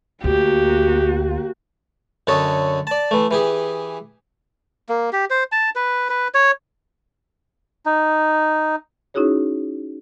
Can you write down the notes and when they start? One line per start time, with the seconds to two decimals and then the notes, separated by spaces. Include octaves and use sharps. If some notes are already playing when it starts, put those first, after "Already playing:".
0.24 D2 A#3 F#4 G4
2.27 F#2 D3 A4 C#5 D#5
2.87 D5 A5
3.11 E3 A3
3.31 E3 G4 G#4
4.89 A#3
5.13 G4
5.30 C5
5.52 A5
5.76 B4
6.09 B4
6.34 C#5
7.86 D#4
9.14 C#4 D#4 E4 F#4 G#4 C#5